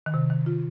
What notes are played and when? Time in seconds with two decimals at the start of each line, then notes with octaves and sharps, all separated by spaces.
0.06 D#3
0.14 C3
0.30 D#3
0.46 F4